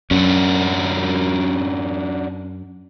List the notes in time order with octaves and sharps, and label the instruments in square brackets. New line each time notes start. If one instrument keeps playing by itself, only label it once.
[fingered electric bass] F#2 [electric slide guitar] C#4 D4 F#4